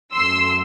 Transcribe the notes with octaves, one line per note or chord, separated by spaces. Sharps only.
F#2 F#3 A3 C6 E6